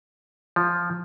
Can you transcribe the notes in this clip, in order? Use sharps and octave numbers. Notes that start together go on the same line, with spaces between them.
F3